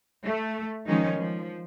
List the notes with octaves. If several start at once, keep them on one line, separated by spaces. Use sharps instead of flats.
A3
D#3 F3 G#3 C#4 D#4
F3